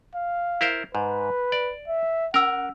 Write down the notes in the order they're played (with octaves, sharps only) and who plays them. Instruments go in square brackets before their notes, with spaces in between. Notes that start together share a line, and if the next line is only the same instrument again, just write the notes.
[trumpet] F5
[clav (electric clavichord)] E4 A#4 C5
[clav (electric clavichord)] G#2 [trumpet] B4
[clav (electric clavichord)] D5
[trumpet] E5
[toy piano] C#4 E6 [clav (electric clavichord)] A#4 [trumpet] F#5